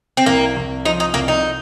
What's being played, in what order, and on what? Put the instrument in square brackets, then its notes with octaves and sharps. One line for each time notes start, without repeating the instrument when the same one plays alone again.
[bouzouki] C4
[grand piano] C2 [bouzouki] A#3
[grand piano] C2
[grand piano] F3 [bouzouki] D#4
[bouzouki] D#4
[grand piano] C2 [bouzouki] A#3
[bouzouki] D#4